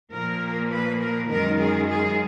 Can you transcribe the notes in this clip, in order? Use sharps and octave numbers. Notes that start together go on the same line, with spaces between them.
A#2 F3 A#3 A#4
B4
A#4
F#2 D#3 G#3 A#4
G#4
G#4